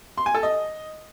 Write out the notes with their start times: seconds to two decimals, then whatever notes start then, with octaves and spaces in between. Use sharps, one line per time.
0.17 C6
0.26 G#5
0.34 A4
0.43 D#5